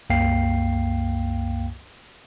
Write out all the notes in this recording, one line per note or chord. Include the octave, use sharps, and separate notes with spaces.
C2 F#2 A#3 F5 G5 C7